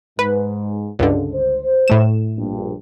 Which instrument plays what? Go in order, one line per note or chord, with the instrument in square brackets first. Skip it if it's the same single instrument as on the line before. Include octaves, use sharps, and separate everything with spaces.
[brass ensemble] G#2 [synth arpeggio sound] B4
[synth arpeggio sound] C#2 G2 D3
[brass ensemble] C5
[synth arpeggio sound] A2 A3 E7
[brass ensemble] A#1 G2